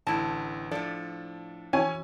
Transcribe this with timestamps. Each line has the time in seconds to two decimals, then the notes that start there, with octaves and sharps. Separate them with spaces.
0.07 A1 D3 E4 A5
0.71 A2 F3 D4 A4 D5
1.73 E3 C#4 G#5